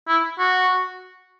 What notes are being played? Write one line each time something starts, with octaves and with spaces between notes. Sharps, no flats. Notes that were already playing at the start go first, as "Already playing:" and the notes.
E4
F#4